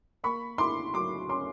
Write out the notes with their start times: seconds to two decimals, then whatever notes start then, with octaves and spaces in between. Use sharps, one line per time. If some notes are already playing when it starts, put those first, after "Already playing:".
0.23 A#3 B5 C#6
0.58 E4 C6 D6
0.94 F#3 C6 D6
1.29 C#4 C6 D6